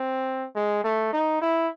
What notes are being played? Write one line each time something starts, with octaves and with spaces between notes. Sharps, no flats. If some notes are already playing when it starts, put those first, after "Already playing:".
Already playing: C4
G#3
A3
D#4
E4